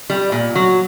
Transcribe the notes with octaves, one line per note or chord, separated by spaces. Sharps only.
G3
A#2
F#3